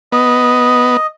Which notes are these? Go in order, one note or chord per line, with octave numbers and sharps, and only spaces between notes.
B3 D#5